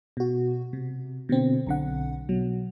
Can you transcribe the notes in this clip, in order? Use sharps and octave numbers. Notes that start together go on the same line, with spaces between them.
B2 F#4
C3
B2 D3 C4
B1 D3 F#5
B2 F#3